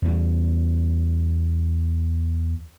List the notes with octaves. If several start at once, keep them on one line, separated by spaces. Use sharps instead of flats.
E2 G3